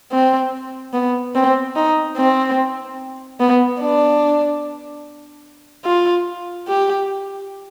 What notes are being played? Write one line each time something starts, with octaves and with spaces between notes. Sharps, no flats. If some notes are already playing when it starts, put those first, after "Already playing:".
C4
B3
C4
D#4
C4
B3
D4
F4
G4